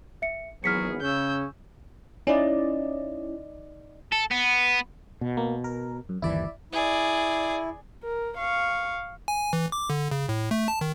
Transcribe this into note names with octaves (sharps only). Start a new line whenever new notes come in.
E5 C#7
G#1 E3 F#3 B3 G#4 F6 B6 C#7
C#3 C#4 E6 G6
C#4 D#4 E4 D5 D#5
A4
B3
B2
A#3
A#4
F#2
G1 D#2 E3 E4 D5 E5
E4 G#4 D5
A#4
F5 C#6
G#5
E3
D6
D3
C#3
A2
A3
A5
D#3